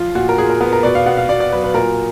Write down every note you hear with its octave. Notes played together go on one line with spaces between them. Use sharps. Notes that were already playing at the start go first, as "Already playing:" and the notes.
Already playing: F3 F4
A#2 F#4
A#4
A#2 G#4
A#4
B3 A#4
A#4
B2 D5
F5
B2 F#5
F5
B2 D5
D5
F#3 B4
B4
A#2 A#4